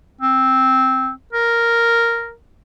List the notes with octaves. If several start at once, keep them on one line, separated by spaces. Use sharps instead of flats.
C4
A#4